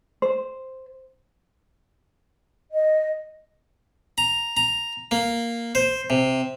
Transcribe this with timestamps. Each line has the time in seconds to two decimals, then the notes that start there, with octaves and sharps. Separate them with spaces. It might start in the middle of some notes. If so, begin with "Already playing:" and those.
0.22 C5
2.72 D#5
4.18 A#5
4.57 A#5
5.11 A#3
5.75 C5
6.10 C3